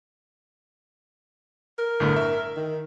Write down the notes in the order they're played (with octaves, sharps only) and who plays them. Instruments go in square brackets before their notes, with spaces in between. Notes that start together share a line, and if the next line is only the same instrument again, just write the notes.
[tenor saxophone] A#4
[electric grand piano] G1 A2 D3
E5
[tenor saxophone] D#3